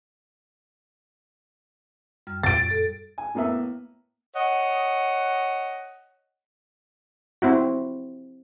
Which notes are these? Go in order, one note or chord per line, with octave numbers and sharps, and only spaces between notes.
F#2 G3 F6
A#2 A6 D7
A4
G#5
A2 A#3 B3 E5
C#5 D#5 F#5
C4 E4 F#4